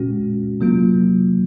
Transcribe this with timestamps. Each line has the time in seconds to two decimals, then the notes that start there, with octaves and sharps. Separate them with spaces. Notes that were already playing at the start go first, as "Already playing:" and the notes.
Already playing: A#2 G#3 C#4 F#4
0.60 C3 F#3 A#3 F4